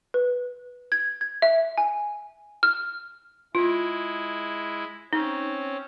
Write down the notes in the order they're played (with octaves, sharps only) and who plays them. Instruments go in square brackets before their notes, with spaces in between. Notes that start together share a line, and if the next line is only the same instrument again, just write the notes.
[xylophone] B4
G#6
G#6
E5
G#5
F6
[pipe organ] G#3 E4 [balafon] F4
[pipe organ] C4 C#4 [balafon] D#4